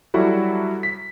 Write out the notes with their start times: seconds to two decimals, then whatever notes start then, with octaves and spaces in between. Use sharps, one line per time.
0.14 F#3 G3 E4 F#4 A4
0.83 B6